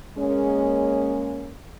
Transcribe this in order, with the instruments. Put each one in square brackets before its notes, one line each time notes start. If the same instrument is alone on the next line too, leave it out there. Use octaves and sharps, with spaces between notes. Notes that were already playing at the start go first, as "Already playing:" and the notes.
[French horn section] G#3 A#3 C#4